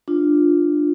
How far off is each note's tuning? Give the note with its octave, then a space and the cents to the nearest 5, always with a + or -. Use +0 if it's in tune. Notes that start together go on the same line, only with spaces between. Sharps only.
D4 +10 F4 +0